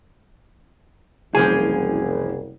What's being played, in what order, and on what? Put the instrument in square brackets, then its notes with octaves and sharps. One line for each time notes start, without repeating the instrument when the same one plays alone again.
[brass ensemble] F#1 C2 [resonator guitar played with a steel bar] E3 F3 G#5 [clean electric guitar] G#4